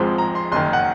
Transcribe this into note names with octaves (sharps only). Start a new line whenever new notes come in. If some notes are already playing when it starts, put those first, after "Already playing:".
Already playing: G#1 G#2 F3 G#3 C4
A#5
C6
F#1 F#2 D#3 C6
F#5